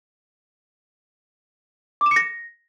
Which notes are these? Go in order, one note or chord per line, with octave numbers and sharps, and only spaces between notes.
D6
E7
C#7
A#6